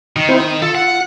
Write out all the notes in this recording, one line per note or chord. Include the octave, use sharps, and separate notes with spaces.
D#3
C4 E4 C5
D#6
F4 A4
F#5